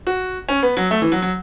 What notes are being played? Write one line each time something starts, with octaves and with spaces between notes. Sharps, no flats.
F#4
C#4
B3
F#3
A3
E3
F#3
F#3